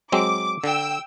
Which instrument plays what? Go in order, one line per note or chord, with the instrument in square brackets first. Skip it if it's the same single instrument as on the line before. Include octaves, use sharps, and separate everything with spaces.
[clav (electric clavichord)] F#3 G#3 C4 [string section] D6
[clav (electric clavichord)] D3 [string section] G5 E6